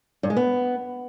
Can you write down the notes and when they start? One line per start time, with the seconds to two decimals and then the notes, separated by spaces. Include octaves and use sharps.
0.23 G2
0.30 G#3
0.37 B3